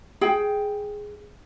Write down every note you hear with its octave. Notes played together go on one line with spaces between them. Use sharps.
G#4 G5